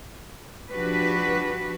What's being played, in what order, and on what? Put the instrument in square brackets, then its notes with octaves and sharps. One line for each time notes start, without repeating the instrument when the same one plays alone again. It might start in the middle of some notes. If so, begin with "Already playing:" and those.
[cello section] F3 D4 F#4 G4 B4